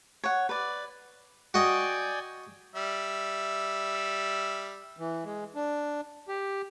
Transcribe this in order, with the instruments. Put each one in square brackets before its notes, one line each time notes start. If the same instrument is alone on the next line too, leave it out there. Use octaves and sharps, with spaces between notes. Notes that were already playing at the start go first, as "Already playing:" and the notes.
[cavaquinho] C#5 F#5
B4 D5
[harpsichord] F#4 D#5 [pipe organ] D5 G5 G#5
[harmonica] G3 E5
[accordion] E3
G#3
D4
G4